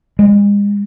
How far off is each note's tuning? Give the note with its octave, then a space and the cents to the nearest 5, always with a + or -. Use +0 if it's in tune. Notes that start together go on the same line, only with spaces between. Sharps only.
G#3 -35